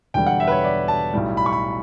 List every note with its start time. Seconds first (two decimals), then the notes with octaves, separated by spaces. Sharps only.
0.14 E1 E2 D3 G3 G5
0.26 F#5
0.40 E5
0.48 B4
0.52 C#5
0.64 D5
0.88 A5
1.14 B1 A2 G3
1.37 B5
1.46 C#6
1.53 B5